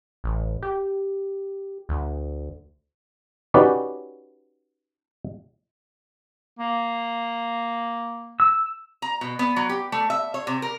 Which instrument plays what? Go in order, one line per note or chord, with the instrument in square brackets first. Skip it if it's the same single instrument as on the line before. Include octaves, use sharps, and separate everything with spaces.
[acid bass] A1
G4
D2
[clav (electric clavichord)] C#4 D#4 F#4 G4 B4 D5
[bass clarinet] A#3
[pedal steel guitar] E6
[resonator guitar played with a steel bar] A#5
B2
B3
F#3
G4
A3
E5
C#5
C3
A#4